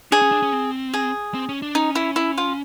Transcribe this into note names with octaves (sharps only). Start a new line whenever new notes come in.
D4 G#4
C#4
D4
C#4
C4
G#4
C4
C#4
D4
C#4 D#4
E4
E4
F4